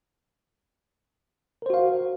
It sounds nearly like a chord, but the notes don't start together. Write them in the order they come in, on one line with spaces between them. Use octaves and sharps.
A#4 C5 F#4 F5